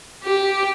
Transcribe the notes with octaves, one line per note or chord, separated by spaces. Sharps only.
G4